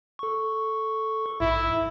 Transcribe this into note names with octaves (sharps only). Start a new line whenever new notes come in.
A4 C#6
A#1 G#2 E4